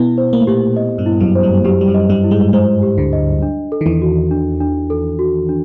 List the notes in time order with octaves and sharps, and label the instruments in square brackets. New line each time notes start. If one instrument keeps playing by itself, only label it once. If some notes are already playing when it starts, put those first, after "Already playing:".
Already playing: [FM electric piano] B2 B3 [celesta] E4
[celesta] C5
[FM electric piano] A#3
A3
[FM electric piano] A#2 A#3 [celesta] G4
[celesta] D#5
[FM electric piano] G2 G3
[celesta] E4
[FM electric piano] F#2 F#3
[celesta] C5
[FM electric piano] G2 G3
[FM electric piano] F#2 F#3 [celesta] G4
[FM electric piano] G3
F#2 F#3
[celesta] D#5
[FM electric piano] G2 G3
[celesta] E4
[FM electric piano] G#2 G#3
[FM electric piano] G#2 G#3 [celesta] C5
[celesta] G4
[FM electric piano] D2 D3
[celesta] D#5
D4
A4
[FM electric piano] D#3
E2 E3
[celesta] F#4
D4
D4
A4
F#4
D4